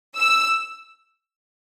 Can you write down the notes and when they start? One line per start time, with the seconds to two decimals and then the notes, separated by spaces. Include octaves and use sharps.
0.16 E6